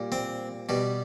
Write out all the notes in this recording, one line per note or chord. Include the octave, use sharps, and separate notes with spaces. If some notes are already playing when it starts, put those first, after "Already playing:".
Already playing: A#2 G3
C4
B2 G3